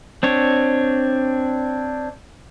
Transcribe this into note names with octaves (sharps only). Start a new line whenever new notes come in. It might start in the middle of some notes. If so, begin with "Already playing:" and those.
C4 D4 C#5